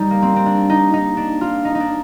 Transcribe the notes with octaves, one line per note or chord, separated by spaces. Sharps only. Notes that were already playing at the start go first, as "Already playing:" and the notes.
Already playing: G3 D#4
A#3
C4
C4
D4
D#4
D#4
D4
F4
D#4
D#4
D4